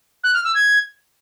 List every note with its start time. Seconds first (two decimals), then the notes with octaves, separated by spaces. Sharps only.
0.24 F#6
0.34 F6
0.44 E6
0.55 G#6